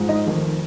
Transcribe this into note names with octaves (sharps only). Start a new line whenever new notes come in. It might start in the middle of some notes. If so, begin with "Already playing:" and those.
Already playing: G#2 F3 G#3
D#4 D#5
F1 F2 D#3